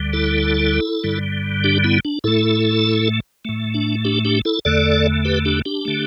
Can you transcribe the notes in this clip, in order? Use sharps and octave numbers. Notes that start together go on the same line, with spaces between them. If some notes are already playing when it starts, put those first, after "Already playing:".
Already playing: D2 D3 G3
E4 A4
G2 D3 G3
D4 G4
B3 E4
D4
A2 A3 E4 A4
A2 A3
D4
D4 G4
D4 G4
E4 A4
E2 D3 A3 A4 D5
G4 B4
D4 G4
D4 G4
D3 A3